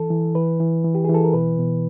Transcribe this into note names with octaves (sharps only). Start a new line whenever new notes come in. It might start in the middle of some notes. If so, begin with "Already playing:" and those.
Already playing: E3 A4
E3
E3 B4
E3
E3
G4
E3 G#4
A4
A#4
B2 B4
B2